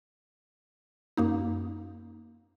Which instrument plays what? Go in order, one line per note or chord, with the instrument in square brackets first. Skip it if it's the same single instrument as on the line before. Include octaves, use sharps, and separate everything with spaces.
[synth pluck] F#2 A#3 D#4